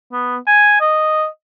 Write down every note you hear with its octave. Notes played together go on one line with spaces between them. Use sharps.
B3
G#5
D#5